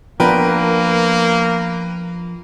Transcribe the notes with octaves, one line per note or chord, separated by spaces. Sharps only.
F3 A#3 B3 D4 A#4 B4 G5